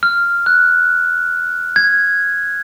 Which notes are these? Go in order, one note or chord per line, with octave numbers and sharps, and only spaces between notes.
F6
F#6
G#6